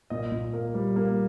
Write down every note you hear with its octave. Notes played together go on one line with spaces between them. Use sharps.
A#2 D#5
A#2
A#3
G3
A#3